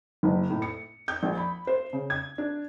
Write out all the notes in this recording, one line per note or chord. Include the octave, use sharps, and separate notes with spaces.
F#1
A2
C#7
G6
A#1
B5
C5
C#3
G#6
D4